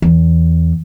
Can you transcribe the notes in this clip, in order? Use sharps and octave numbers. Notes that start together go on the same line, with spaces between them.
E2